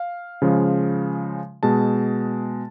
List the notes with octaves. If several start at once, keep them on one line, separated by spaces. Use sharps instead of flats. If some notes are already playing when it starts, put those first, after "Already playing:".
Already playing: F5
C#3 F3 G#3
B2 G#3 A5